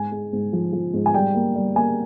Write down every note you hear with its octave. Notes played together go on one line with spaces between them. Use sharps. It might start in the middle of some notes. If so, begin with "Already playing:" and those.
Already playing: G#2 G#5
G#3
G#2
F3
F3
G#2
G#5
G3 G5
A#3
G3
A#3 G#5